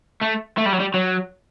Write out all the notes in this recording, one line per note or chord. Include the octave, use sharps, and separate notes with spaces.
A3
A3
G3
F#3
G3
F#3